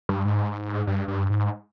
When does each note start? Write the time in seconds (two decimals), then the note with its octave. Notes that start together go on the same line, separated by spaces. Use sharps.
0.09 G2
0.25 G#2
0.87 G2
1.08 G2
1.30 G#2